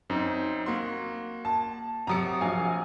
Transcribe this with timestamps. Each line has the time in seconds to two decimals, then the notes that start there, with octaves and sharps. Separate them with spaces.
0.10 F#2 C4 D#4
0.66 A#3 F#4 C6
1.45 A5
2.07 C3 F#3 A#5 D#6 C#7
2.41 A#1 F#4 F5 G#5